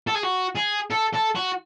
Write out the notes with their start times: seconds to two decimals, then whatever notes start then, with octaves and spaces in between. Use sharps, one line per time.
0.07 A4
0.15 G#4
0.23 F#4
0.56 G#4
0.91 A4
1.13 A4
1.35 F#4